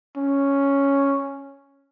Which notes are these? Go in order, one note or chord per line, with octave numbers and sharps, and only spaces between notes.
C#4